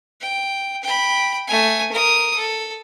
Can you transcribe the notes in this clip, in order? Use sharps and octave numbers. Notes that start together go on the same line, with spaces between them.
G5
G5 B5
A3 G#5
A#4 D#6
A4